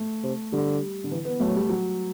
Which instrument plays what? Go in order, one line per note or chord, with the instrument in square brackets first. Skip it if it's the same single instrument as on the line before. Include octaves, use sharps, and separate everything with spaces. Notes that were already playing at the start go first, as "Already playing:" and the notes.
Already playing: [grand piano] A3
[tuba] C3
[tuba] D3 [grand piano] G3
[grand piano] D3
E3
B3
[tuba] F#3 [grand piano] A3
[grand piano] G3
F#3